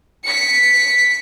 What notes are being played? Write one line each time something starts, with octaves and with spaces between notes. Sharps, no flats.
B6 C#7